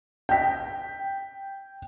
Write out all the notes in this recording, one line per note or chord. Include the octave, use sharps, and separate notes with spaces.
G5 B6